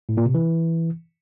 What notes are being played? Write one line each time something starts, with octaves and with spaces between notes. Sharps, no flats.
A2
A#2
C3
E3